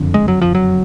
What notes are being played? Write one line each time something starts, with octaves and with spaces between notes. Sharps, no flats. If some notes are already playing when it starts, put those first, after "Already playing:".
Already playing: F#1 F2 D3
G#3
F#3
F3
F#3